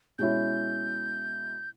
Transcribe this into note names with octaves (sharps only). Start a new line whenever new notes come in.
B2 G#3 C#4 E4 G6